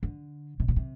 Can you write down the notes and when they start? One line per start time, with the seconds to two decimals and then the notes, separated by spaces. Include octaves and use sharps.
0.03 D3
0.60 C3
0.68 A#2
0.76 C3